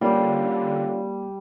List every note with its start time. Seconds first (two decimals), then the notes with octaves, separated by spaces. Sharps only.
0.01 D3 G3 A#3 C#4 F4 D5